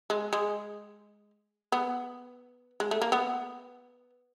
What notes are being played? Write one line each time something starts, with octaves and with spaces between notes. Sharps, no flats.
G#3
G#3
B3
G#3
A3
A#3
B3